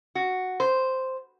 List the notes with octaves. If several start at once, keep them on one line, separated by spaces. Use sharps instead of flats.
F#4
C5